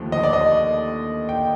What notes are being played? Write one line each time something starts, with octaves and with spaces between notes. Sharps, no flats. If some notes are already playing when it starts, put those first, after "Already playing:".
Already playing: D#2 D3 F3 A3
D#5
D5
D#5
G5